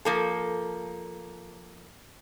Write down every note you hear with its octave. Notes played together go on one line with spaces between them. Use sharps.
F3 A#3 A4